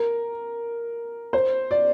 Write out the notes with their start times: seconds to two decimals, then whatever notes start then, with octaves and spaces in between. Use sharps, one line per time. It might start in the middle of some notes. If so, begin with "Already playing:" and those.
Already playing: A#4
1.33 C5
1.71 D5